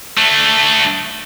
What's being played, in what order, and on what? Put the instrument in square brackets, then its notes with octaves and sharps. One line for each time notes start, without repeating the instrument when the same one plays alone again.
[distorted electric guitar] A3 D4